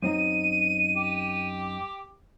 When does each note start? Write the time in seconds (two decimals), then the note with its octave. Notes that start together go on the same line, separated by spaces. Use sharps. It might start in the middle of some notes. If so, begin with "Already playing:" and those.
0.02 F#2 C4 D#4 D#7
0.97 G4